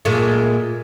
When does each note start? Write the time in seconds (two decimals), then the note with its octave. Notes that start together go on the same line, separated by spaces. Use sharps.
0.05 A#2 G#3 A3